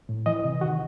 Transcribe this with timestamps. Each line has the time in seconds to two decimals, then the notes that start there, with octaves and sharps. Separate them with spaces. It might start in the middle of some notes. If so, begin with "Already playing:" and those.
0.09 A2
0.26 E3 D#5
0.44 C3
0.61 D#3 F#4